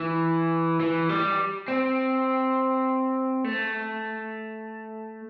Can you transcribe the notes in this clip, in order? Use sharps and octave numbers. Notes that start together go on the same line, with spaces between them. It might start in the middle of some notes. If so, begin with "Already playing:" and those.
Already playing: E3
E3
G3
C4
A3